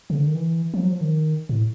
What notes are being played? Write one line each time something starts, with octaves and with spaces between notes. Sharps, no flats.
C#3
D3
D#3
E3
F3
F#3
F3
D#3
A2